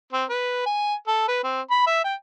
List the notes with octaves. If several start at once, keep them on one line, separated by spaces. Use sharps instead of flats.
C4
B4
G#5
A4
B4
C4
B5
E5
G5